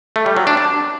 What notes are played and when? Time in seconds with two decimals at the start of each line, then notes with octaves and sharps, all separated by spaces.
0.16 A3
0.26 G3
0.37 F#3
0.47 D4
0.57 D4